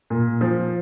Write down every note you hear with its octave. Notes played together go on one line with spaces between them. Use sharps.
A#2
F3